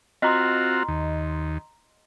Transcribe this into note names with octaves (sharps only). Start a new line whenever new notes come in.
C4 F4 F#4 D#5 A#5 C6
D#2